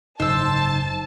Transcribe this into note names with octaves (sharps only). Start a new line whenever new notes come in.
F#1 G#2 D#4 C5 A5 E6